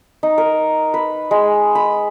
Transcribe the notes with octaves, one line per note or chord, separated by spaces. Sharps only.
D#4
A#4
B4
G#3
B5